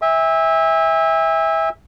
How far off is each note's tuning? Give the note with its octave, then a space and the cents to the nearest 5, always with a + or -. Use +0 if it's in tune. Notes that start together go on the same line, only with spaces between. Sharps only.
E5 -15 G#5 -45